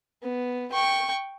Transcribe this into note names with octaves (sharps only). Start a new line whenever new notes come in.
B3
G5 C#6